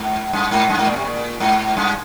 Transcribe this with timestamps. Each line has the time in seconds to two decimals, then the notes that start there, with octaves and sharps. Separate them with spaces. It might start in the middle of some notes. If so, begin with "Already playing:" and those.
Already playing: G#2
0.33 G2
0.51 G#2
0.69 G2
0.78 G#2
0.87 A#2
0.96 C3
1.05 A#2
1.40 G#2
1.77 G2